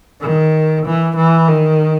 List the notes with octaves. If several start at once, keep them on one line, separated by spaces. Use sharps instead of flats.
D#3
E3
E3
D#3